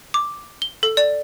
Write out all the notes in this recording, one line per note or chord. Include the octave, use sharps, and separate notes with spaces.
D6
G7
A4
D5